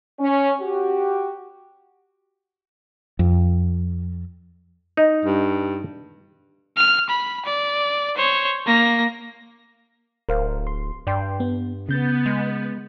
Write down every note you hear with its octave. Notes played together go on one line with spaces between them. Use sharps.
C#4
F#4 G4
F2
D#4
G2
F6
B5
D5
C5 C#5
A#3 A#6
D1 A#4 C5 F5
C6
G2 D5 G5 C6
B3
C#3 B3 G6 A6
G#3